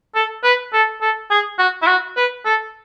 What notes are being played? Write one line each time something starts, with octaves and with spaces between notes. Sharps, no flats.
A4
B4
A4
A4
G#4
F#4
E4
F#4
B4
A4